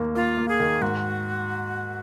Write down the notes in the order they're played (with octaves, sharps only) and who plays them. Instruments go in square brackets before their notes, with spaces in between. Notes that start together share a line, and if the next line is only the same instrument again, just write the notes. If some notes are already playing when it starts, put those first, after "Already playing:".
Already playing: [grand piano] D#2 D#3 A#3
[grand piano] A#3 [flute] F4
[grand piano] A#3
[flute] G#4
[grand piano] D#3
[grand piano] G#2 [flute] F#4